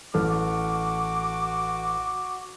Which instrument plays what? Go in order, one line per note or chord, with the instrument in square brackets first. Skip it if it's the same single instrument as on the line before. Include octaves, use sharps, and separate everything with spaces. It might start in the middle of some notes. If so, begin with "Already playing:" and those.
[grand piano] A1 A4 F6 [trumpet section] F#4 D6